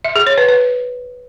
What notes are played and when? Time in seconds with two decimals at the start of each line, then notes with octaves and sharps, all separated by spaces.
0.05 E5
0.16 G#4
0.27 C#5
0.38 B4
0.49 B4